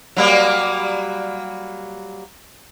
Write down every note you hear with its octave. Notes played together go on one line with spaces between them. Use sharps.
F#3 G3 A#3